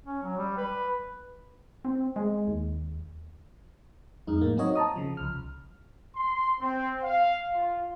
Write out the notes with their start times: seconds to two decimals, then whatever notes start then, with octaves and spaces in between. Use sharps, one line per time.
0.06 C#4
0.23 F#3
0.37 G3
0.57 B4
1.85 C4
2.16 G#3
2.47 D#2
4.27 F2 G#3 D#4
4.41 A2 A#3
4.57 F#3 C4 D#4 F#4 C#5 D#5
4.75 A5 A#5 D#6
4.96 C#3 F3
5.17 C2 F6
6.16 C6
6.60 C4
7.04 F5
7.55 F4